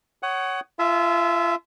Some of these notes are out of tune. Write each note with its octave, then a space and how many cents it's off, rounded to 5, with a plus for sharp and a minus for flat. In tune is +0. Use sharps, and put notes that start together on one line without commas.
C#5 +0 F#5 +25 D#6 +0
F4 -30 E5 +0 A5 -40